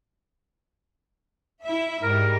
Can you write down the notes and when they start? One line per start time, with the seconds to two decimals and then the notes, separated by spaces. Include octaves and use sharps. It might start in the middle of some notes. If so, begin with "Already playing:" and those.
1.64 E4 E5
2.03 G#2 G3 A#4